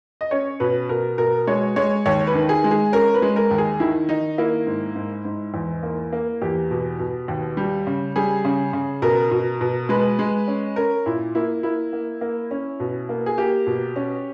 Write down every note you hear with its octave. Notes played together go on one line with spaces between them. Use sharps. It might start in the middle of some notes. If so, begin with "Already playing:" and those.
D#5
C#4 C#5
B2 B4
B2 A#4
B2 A#4
G#3 C#5
G#3 C#5
D#2 C#5
B4
D#3
G#4
G#3
G#4
C#4 A#4
B4
G#3
A#4
D#2
G#4
D#3 E4
D#3 D#4
A#3 E4
G#2
G#2
G#2
E2
A#3
A#3
E2 G4
B2
B2
D#2
G3
C#3
G3 G#4
C#3
C#3
B2 A#4
B2
B2
G#3 B4
G#3
C#4
C#4 A#4
A#2 E4
A#3 E4
A#3 E4
A#3
A#3
C#4
B2
A#3
G#4
A#3 G4
B2
C#4